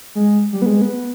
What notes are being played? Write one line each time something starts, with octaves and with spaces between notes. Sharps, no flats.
G#3
G3
B3
G#3
B3